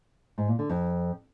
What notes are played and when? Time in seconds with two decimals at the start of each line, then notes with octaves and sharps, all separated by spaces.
0.38 G#2
0.48 A#2
0.59 D3
0.69 F2